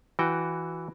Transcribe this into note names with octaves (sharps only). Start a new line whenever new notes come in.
E3 F#4 G5